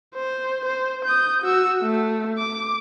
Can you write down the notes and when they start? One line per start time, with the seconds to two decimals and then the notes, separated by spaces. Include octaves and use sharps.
0.15 C5
0.65 C5
1.05 D#6 G6
1.43 F#4 E6
1.82 A3
2.38 D6